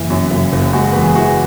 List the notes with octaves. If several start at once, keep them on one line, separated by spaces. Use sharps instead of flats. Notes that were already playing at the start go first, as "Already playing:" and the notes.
Already playing: F#1 E3 E4
F#2
F#1
F#1
G#3 F#4
E2 B4
G#4
E3 F#4